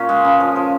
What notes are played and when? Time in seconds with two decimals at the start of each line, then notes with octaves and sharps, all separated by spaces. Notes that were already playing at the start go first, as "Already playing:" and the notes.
Already playing: A#2 C#4
0.09 G#3
0.25 C#3
0.40 F3
0.56 F3